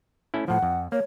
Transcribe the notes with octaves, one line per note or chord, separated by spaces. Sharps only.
A3 C#4 E4
A2 F3 F#5
F2
A#3 C#5